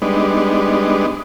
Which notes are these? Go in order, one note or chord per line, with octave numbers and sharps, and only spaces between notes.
G3 G#3 B3 D4 D#4